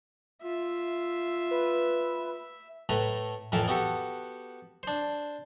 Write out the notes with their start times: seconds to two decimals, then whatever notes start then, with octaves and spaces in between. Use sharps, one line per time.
0.43 F4 E5
1.51 B4
2.89 A2 A3 B4 A#5
3.52 F2 A2 E3 A#4 E5 A5
3.68 B3 F#4 G4 A4
4.83 D4 C5